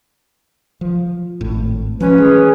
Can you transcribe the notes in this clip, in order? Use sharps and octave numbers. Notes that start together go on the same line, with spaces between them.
F3
G#1 A2
F3 F#3 G#3 C#4 B4
E3 G#4